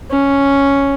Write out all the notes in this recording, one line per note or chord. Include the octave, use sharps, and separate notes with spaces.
C#4